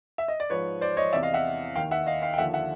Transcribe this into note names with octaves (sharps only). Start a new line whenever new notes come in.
E5
D#5
D5
G#2 F3 B4 C#5
C5 D5
C#5 D#5
E2 C3 E3 D5 E5
D#5 F5
E5 F#5
D#2 D#3 F5 G5
E5 F#5
D#5 F5
F5 G5
G5
D#2 D3 F3 E5 F#5
E5 F#5